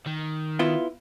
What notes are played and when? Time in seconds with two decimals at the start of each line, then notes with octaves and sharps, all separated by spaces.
0.06 D#3
0.59 B3 E4 F4